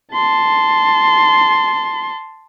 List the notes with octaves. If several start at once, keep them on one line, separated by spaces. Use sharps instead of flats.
A5 C6